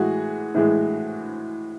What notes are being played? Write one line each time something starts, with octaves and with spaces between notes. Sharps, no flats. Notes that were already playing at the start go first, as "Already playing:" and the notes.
Already playing: A2 E3 G#3 F#4 G#4
A2 E3 G#3